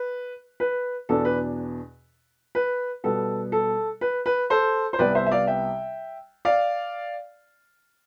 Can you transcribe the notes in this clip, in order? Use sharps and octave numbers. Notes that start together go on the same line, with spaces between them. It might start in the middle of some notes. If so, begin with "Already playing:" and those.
Already playing: B4
B4
E2 B2 B3 D4 A4
B4
B4
B2 G3 B3 A4
A4
B4
B4
A4 C5
C5
C2 C3 G3 B3 B4 D5
C5 E5
E5
D5 F5
E5 G5
D5 F5